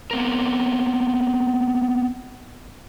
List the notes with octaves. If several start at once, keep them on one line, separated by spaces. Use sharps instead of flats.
B3 C4 A#4